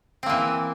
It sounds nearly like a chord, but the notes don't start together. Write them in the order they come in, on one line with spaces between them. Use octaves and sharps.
C4 A#3 E3